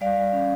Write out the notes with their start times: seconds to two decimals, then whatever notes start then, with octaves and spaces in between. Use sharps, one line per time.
0.01 G3 D5 F5
0.17 G3
0.33 C#4